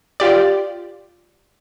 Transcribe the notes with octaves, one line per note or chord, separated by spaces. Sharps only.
F4 G4 D5